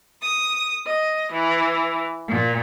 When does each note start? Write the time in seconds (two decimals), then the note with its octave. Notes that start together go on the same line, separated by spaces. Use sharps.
0.21 D#6
0.86 D#5
1.32 E3
2.28 A#2